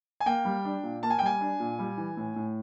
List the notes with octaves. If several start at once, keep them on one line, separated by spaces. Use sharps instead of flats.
G#5
A#3 G5
G3
D4
A#2
A#3 A5
G#5
G5
G3 G#5
D4
A#2
G3
E3
A2
A2